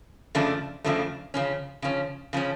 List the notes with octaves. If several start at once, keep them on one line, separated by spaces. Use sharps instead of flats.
F2 C#3 F3 A3 D4
F2 C#3 F3 A3 D4
C#3 F3 C#4
C#3 F3 C#4
C#3 F3 C#4